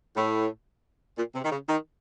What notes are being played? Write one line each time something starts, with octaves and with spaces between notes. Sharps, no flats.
A2
A#2
C3
D#3
C#3
D#3